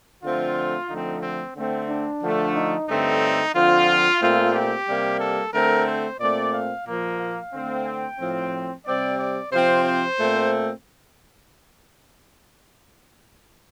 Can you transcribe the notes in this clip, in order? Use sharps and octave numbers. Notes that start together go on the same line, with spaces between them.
D3 F3 A3 C4 F4
D3 F3 A3 C4 D#4
C4
D3 A3 C4
D4
D3 F3 A3
D#4
G2 D3 A3 C4 D#4
D3 F3 C4 F4
A#2 A3 C4 F4
G4
C3 G3 A#3
A4
D3 A3 C4 A#4
C5
A#2 A3 C4 D5
F5
A#2 F3 A#3
F5
D3 A3 C4
G5
A2 F3 C4
C3 G3 C4 D5
D5
C3 F3 C4 C5
C5
A#2 A3 C4